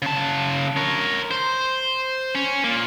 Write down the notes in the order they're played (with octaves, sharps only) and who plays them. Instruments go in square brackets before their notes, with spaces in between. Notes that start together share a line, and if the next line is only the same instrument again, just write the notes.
[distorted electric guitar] C#3 A5
A#4 C#5
C5
C#4
A#2 A#3